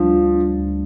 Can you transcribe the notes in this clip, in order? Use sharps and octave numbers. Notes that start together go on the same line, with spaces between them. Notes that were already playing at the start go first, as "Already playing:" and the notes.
Already playing: D2 F3 G3 D4
D2
D4
D2